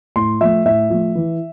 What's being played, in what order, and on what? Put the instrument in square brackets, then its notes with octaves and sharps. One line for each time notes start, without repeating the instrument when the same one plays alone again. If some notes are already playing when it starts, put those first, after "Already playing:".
[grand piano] A2 C6
F3 A3 E5
A2 E5
F3 A3
E3